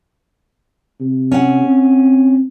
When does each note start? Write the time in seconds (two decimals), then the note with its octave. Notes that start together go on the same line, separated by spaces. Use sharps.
1.00 C3
1.31 C#4 F#5
1.65 C4